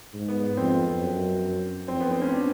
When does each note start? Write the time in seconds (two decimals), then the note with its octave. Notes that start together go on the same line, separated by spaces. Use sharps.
0.14 G#2
0.28 B3
0.43 B3
0.57 F2 C4
1.01 F#2
1.88 F2 C4
2.00 B3
2.11 C4
2.22 C#4
2.32 D4